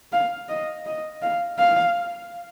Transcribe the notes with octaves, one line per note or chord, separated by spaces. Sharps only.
F5
D#5
D#5
F5
F5